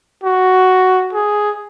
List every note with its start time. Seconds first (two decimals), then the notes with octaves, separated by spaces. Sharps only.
0.23 F#4
1.13 G#4